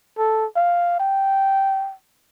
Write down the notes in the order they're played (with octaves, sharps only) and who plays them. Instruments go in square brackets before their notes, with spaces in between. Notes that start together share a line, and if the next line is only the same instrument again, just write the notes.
[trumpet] A4
F5
G5